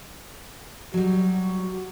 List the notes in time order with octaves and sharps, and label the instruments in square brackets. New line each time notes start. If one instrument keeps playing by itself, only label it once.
[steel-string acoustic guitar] F#3 G3 [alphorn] F#4